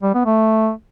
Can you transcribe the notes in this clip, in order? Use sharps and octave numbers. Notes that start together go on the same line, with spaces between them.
G3
B3
A3